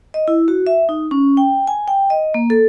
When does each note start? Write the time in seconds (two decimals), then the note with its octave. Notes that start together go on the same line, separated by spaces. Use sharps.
0.14 D#5
0.28 E4
0.48 F#4
0.67 E5
0.89 D#4
1.11 C#4
1.37 G5
1.67 G#5
1.88 G5
2.10 D#5
2.34 A#3
2.50 A4